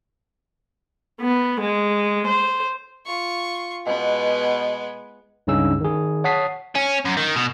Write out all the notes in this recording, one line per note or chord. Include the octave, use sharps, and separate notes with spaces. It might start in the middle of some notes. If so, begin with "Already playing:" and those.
B3
G#3
C5
F4 C#6
B2 G#3 B3
C#2 G2 C#3 C#4 D#4 E6
D#3 G#4
C#5 F#5 A5 D#6 B6 C7
C#4
F#2
D#3
B2